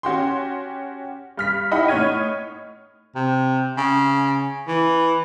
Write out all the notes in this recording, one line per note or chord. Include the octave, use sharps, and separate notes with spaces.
C#4 F#4 G4 C6
G2 F6 B6
D#4 E4 G4 D#5 F#5 B5
A2 D#4 C#5 F6 G#6 D#7
C3
C#3
E3